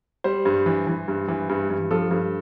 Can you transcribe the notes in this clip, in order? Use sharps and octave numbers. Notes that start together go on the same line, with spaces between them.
G3 C5
G2
E3
E3
G2
E3
G2
G2
F3 A4
G2